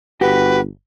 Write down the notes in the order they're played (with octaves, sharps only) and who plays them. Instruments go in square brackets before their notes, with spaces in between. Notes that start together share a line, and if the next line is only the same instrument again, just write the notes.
[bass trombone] G1 [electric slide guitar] F#4 G4 [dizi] B4